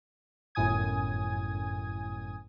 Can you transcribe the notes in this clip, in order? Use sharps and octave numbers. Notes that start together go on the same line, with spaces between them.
G1 F#2 A2 G#5 D#6 G#6